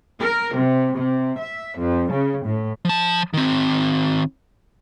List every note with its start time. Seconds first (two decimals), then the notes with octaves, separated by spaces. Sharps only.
0.20 A#4
0.56 C3
0.95 C3
1.39 E5
1.78 F2
2.12 C#3
2.45 A2
2.85 F3 A5
3.34 D#3 C4